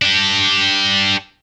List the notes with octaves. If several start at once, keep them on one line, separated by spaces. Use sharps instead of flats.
D4 G4